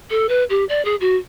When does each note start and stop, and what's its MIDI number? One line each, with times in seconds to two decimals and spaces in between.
0.10 0.27 69
0.29 0.44 71
0.50 0.64 67
0.69 0.84 74
0.85 0.95 68
1.01 1.17 66